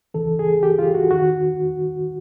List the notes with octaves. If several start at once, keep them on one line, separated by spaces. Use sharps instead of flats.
D2 C#3 E3 A4
G#4
G4
F4
F#4
D#2 D#3 F#4